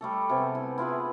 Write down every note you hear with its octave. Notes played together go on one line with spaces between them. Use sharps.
G3 A3 A4
C3 B3 G#4 A4
E4
E4 F4 G#4 B4